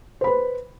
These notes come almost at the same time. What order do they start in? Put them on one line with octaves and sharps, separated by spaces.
C5 B5 B4